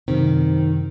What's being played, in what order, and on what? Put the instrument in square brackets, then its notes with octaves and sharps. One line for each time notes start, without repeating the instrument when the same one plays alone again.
[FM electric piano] F#2 C3 C4 [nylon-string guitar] D#3